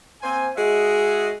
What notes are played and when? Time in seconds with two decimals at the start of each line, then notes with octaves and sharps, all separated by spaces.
0.22 A#3 C4 C5 G#5
0.57 G#3 F#4 G#4 D#5 E5